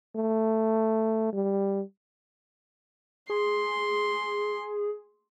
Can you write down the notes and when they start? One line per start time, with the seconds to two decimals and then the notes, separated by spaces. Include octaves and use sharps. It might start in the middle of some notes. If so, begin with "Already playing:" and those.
0.16 A3
1.33 G3
3.30 G#4 C6